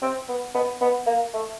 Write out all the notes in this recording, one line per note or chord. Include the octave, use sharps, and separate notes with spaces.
C4
B3
B3
B3
A#3
A3